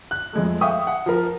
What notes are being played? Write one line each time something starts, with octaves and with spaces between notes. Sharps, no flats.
F#6
F2 G#3 A3
E5 F5 G5 C#6 D#6
F#5
F3 A#4